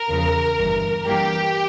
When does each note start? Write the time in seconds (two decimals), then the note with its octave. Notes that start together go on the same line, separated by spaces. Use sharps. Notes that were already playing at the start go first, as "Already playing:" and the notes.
Already playing: A#4
0.09 E2 C#3 F3
0.58 G1 G2 E3
1.07 G2 E3 A#3 G4